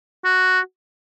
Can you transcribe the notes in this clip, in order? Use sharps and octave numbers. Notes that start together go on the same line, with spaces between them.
F#4